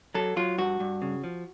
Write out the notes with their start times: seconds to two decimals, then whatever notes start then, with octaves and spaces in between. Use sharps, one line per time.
0.14 F#3 A4
0.36 F#3 F4
0.58 G2 F#4
0.80 G2
1.02 C#3
1.24 F3